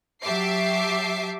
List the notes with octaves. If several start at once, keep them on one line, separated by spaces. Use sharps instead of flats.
F#3 G4 E5 A5 D6 C7